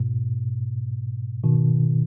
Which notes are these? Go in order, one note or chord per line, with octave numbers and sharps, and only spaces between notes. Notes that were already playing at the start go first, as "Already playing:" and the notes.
Already playing: G#2 B2
B2 D#3